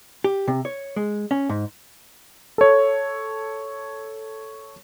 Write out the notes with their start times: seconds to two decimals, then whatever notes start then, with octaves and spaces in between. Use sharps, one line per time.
0.24 G4
0.48 C3
0.65 C#5
0.96 G#3
1.31 C#4
1.49 G#2
2.58 A4 C#5